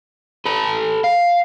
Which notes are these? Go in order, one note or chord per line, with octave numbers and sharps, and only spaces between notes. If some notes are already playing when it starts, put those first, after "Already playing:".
A4 B4
F5